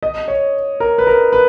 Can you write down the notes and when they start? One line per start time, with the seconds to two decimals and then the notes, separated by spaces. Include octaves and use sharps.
0.03 D#5
0.28 C#5
0.80 A#4
0.98 B4
1.07 A#4
1.33 B4